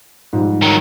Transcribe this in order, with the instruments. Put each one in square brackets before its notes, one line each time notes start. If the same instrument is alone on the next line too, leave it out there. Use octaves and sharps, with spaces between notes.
[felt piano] G#2 F3 G3
[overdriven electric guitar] D#3 F#3